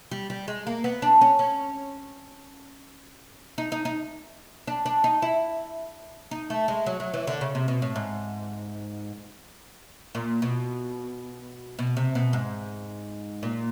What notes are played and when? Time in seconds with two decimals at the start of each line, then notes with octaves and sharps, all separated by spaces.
0.11 G3
0.30 G3
0.48 G#3
0.67 A#3
0.84 B3
1.02 D4
1.21 C#4
1.39 C#4
3.58 D#4
3.72 D#4
3.85 D#4
4.67 D4
4.86 D4
5.04 D#4
5.22 E4
6.31 D#4
6.50 A3
6.68 G#3
6.86 F#3
7.00 F#3
7.14 E3
7.27 D3
7.41 C#3
7.55 C3
7.68 B2
7.82 A2
7.96 G#2
10.15 A#2
10.42 B2
11.79 B2
11.97 C3
12.15 B2
12.33 G#2
13.43 A#2